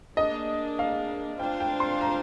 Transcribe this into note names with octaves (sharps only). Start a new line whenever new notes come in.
A#3 D4 G#4 D#5
F5
D4 F4 C5 F5 G5
G5
C6
A#5